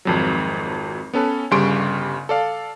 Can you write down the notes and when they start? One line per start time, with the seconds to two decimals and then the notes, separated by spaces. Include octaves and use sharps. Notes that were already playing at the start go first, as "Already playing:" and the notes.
0.05 G#1 F2 F#3
1.13 B3 C#4 A4 B4
1.51 G1 C#3 G3 C6 C#6 D7
2.29 A4 D5 F5